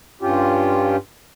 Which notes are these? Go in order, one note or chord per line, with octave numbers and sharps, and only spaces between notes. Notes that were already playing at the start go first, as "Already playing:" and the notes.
G2 C#4 F4 G4